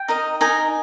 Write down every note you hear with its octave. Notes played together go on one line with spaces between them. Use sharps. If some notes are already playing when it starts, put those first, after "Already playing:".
Already playing: G5
D#4 A#4 D#5
D#4 A#4 D#5 G#5